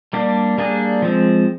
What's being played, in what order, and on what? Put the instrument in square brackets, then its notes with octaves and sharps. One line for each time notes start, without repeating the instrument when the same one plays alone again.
[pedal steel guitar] G3 A#3 D4 G4
G3 A#3 D4 G#4
F3 G#3 C4